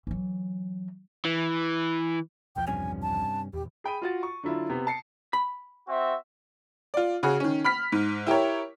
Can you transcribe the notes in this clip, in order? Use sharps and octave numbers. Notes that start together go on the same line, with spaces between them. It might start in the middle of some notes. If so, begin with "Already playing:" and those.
E3 F#3
E3
B1 E2 F3 G5
G2 C3 C#4 G#5
A5
D#1 E2 G4
G#4 G5 B5 D#7
F4 F#4 A6
C#6
D3 F#3 E4 F4
C3 B3
A5 C7 C#7
B5
C4 F#4 E5
F4 D5
C#3 F#4 G#4
D#3 C#4
B5 F6 B6
G#2
E4 G4 A#4 C#5